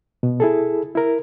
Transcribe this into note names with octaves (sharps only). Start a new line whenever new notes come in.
B2
E4 G#4 A4
E4 A#4